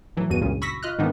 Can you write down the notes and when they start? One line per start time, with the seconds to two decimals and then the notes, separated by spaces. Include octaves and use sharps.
0.17 A2 E3 F#3
0.30 E2 G2 F#4 D#7
0.41 C#2 G2 A#2 C#3
0.62 B5 C#6 E6 A#6 B6
0.83 F4 D#5 F6 F#6
0.99 G#2 D#3 A#3 B3 D4 D#4